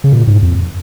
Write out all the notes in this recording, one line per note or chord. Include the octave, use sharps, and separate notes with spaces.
C#3
A#2
G#2
F2